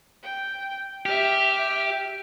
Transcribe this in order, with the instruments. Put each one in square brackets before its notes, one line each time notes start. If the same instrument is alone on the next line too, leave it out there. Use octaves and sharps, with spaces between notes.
[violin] G5
[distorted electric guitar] G4 [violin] E5 F6